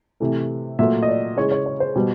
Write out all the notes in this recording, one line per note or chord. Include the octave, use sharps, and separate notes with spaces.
C3 E3 A3
A#2 F#3 A3 E5
D#5
D5
C#3 E3 G#3 C#5
C#5
C#5
C5
B2 G3